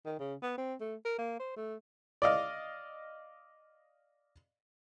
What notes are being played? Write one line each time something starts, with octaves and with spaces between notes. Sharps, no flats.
D#3
C#3
B3
C4
A3
A#4
A#3
C5
A3
D5 D#5 F5